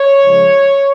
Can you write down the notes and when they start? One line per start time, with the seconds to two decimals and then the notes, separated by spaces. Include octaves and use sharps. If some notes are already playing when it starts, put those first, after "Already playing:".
Already playing: C#5
0.24 C#3 F3 G#3